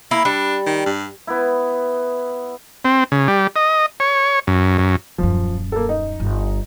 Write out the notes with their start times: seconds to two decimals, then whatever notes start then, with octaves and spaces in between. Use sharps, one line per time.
0.11 A#3 E4
0.25 G3 D4
0.66 D#3
0.86 G2
1.27 B3 E4
2.85 C4
3.12 C#3
3.28 G3
3.56 D#5
4.00 C#5
4.47 F#2
4.78 F#2
5.18 D#1 F#2 F3
5.72 A#3 A4
5.89 D#4
6.20 G1